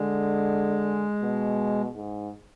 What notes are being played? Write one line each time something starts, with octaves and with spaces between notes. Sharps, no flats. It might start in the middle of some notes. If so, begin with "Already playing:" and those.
Already playing: D3 G#3
B2
G#2